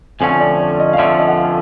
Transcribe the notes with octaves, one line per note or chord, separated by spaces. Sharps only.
F2 D3 F3 A3 C#4 G#5
D5
D5
D#5
F5
F2 D3 F3 A3 C#4 E5
D#5
F#5
F5